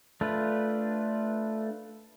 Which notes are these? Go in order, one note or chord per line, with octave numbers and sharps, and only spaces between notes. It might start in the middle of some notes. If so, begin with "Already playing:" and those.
A3 D4 F4 B4